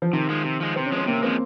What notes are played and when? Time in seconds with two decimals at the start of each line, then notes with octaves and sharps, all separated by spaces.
0.02 F3
0.13 C3 D#3
0.29 F3 G#3
0.44 C3
0.60 F3 G#3
0.76 C3 C4
0.86 C#4
0.92 F3 G#3 C4
1.07 C3 A#3
1.22 F3 G#3 C4